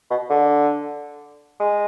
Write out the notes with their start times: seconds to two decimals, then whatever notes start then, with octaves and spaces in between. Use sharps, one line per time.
0.10 B2
0.30 D3
1.60 G#3